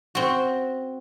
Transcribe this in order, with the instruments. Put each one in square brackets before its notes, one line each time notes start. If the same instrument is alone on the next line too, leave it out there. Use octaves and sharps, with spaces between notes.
[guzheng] C4 F#4